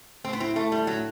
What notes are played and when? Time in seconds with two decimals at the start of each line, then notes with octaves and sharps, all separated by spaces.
0.24 A2 C4
0.33 B3
0.40 C4 E4
0.56 A2 A3
0.71 A2 G3
0.87 A2 F#3